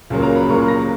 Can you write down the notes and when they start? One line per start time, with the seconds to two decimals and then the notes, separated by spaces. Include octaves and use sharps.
0.10 C#2 C#3 F#3 A#3
0.23 A#5
0.36 B5
0.49 C#2 C#3 F#3 A#3 C#6
0.68 A#6